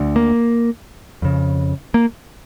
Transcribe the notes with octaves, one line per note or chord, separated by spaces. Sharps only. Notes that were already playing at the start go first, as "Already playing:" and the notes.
Already playing: D2 D3
A#3
F2 C#3
A#3